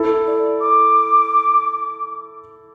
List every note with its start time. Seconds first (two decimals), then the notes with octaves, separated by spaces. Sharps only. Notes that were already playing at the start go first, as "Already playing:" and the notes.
Already playing: E4 A4
0.27 D5
0.60 D6